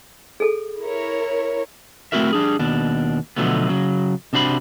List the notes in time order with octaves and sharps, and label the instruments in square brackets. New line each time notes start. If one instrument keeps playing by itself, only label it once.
[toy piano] G#4 A4
[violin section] E4 A#4 C#5
[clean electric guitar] A3 C4 E4 F#4 A#4 E5
G3 D4 G#4
D#2 B2 D4
B2 D3 F3 F#3 A3 B3
C#3 F#3
C3 D4 F#4 C5 B5